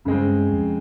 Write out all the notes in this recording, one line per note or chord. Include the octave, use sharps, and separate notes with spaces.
G2 C#3 G#3 C4
F2